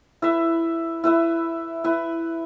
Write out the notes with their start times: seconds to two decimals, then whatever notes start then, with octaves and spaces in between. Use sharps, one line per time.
0.22 E4 B4 E5
1.04 E4 B4 E5
1.84 E4 B4 E5